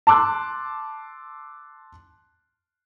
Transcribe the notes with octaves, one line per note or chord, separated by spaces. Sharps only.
A5 C6 D6 E6 F#6